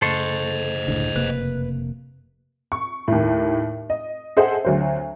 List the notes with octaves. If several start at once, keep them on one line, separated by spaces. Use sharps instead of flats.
F#2 C#3 A3 A4 C5 D#5 C6 C#6
C#2 A2 D3
F1 C3 A#3 B4
C#6
D#2 A2
D#5
G#4 A4 C5 D#5 E5 F#5
D2 F#3 C5